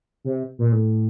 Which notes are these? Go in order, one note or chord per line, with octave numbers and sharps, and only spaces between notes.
C3
A#2
A2